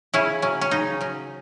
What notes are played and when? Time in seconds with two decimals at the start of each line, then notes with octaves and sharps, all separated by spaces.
0.14 C#3 C#4 E4
0.42 F#3 C#4
0.61 C#4
0.71 C#3 D#4
1.01 F#3 C#4